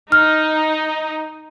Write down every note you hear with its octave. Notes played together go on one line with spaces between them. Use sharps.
D#4 F6